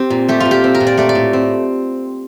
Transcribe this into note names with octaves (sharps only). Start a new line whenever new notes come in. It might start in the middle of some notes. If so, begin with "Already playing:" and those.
Already playing: C4 G4
A#2
A3 G4
A#2 F4
G4
C4
A#4
A#2
D5
A3 D5
D5
A2
C4